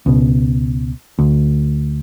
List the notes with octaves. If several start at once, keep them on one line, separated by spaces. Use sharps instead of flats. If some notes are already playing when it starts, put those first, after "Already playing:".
C#2 B2
D2